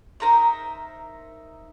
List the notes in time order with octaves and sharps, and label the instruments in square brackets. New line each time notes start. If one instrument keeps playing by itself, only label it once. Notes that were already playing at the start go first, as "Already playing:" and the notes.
[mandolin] D#4 A#4 C5 E5